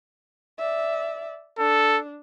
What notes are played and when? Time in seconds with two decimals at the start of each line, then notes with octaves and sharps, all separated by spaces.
0.58 D5 E5
1.59 D4 A4